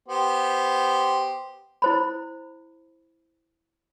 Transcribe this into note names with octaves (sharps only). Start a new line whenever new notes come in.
B3 G4 C5
E4 C5 B5